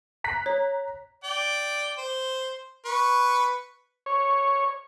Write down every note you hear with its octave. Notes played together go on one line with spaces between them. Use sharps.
A#5 F#6 B6
C#5
D5 G5
C5
B4 C#6
C#5